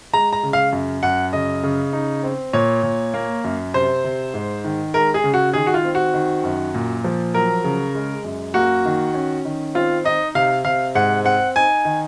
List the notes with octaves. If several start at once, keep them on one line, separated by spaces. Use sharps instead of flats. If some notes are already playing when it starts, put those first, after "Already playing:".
G#3 A#5
A#5
C#3
F5
F#2
F#2 F#5
C#3 D#5
C#3
D#4
C4
A#2 C#5
A#2
A#3
F#2
C3 C5
C3
G#2
D#3
G#3 A#4
G#4
C#3
F#4
D#3 G#4
F#4
F4
C4
F#4
D#3
F#2
A#2
F3
F#3 A#4
C#3
G#3
F#2
A#3 F#4
D#3
C#4
D#3
C4 F4
D#4 D#5
C3 F5
C3 F5
G#2 F#5
C4 F#5
D#4 G#5
D#3